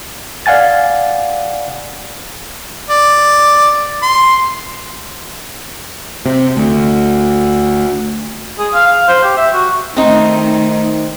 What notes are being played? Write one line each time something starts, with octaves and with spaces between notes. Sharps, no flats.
D5 F5 F#5 G#5 A6
D5
C6
C3
D2
G#4
F5
F5
C5
G4
E5
F#4
D#3 A3 C4 D#4